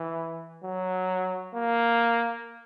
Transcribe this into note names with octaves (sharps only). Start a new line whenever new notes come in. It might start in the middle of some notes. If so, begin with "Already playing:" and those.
Already playing: E3
F#3
A#3